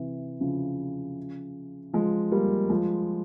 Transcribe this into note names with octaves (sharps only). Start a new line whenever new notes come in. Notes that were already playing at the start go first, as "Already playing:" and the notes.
Already playing: C3 E3
C#3 F3
F3 G#3
G3 A#3
F3 G#3